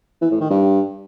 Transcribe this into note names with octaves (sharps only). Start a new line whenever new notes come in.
E3
A2
D#3
G2